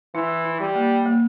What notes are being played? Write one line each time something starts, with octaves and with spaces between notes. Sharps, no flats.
E3 E4
E4
G3
A#3
A#3